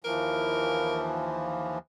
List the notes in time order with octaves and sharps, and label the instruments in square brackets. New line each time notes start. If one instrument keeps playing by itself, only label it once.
[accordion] D#2 E3 F3 [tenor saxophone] A#4